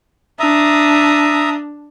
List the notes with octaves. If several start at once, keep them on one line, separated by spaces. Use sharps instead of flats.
D4 E5 A#5 D#6